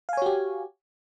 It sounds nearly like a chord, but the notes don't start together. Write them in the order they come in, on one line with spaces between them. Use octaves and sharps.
F5 G#5 C#5 F#4 G4